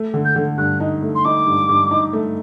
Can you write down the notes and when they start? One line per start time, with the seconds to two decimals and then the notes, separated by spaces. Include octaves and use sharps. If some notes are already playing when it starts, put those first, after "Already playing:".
Already playing: A3
0.14 D3
0.25 G6
0.36 D3
0.58 G2 F#6
0.80 D#4
1.03 A3
1.15 C6
1.25 D#4 D6
1.47 G2
1.69 G2
1.91 D#4
2.13 A3